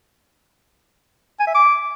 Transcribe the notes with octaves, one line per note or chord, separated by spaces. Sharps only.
G#5
E5
D6